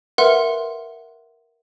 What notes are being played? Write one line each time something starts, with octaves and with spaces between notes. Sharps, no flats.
A#4 B4 E5 F#5 C6